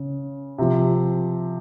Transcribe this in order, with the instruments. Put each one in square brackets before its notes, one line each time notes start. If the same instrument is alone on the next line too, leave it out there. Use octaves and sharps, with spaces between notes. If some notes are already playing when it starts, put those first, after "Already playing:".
Already playing: [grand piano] C#3
C3 F3